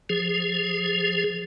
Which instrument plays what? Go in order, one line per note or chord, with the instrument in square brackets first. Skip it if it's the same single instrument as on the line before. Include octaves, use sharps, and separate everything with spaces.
[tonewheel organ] F3 G#4